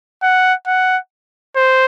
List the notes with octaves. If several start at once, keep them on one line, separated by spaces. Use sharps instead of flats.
F#5
F#5
C5